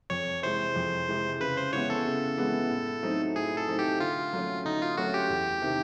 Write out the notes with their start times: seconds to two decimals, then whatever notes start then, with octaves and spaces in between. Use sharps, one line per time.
0.10 F2 C#5
0.42 C3 E3 G#3 C5
0.76 F2
1.08 C3 E3 G#3
1.40 C#3 B4
1.56 C5
1.73 E3 G#3 B3 E4 C#5
1.90 A4
2.05 C#3
2.38 E3 G#3 B3 E4
2.70 A2
3.03 F#3 A3 C4 D#4
3.36 A2 G#4
3.57 A4
3.68 F#3 A3 C4 D#4
3.79 G4
4.00 D3 F4
4.33 F#3 A3 C#4
4.65 D3 D#4
4.81 F4
4.97 F#3 A3 C#4 F#4
5.14 G4
5.30 E2
5.62 C3 D#3